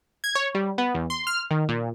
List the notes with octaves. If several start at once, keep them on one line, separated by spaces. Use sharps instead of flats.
G#6
C#5
G3
B3
E2
C6
F6
D#3
A#2